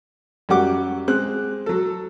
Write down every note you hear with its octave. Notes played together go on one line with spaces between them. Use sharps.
F#2 F#3 G3 G4 F#5 D6
G#3 C4 F#6
F#3 A4